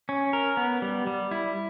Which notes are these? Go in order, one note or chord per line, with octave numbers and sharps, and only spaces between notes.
C#4
A#4
B3
G3
G3
E4